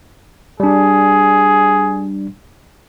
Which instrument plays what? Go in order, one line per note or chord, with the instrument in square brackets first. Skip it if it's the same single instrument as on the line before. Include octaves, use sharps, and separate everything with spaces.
[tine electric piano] G3 D4 [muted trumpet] G#4